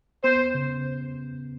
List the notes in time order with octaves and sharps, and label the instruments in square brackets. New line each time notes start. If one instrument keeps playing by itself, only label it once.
[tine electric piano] B3 [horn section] C5
[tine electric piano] C#3